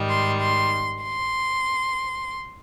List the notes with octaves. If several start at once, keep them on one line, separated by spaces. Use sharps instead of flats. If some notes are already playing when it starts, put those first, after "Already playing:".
Already playing: G#2 D#3 G3
C6
C6
C6